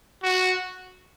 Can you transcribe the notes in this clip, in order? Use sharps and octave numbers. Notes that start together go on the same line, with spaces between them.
F#4